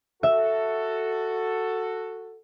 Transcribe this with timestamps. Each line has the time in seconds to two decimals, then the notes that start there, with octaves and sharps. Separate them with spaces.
0.23 F#4 A4 E5